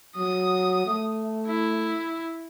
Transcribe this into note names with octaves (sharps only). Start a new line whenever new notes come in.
F#3 D#6
A3
E4